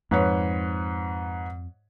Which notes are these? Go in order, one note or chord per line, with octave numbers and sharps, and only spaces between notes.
F2 G#2 B4 C#5